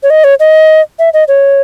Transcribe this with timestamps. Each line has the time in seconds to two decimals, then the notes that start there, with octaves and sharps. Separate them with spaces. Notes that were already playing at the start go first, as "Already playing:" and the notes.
0.03 C#5
0.10 D#5
0.24 C#5
0.40 D#5
0.99 E5
1.14 D#5
1.28 C#5